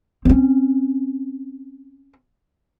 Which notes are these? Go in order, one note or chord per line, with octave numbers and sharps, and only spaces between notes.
C4 C#4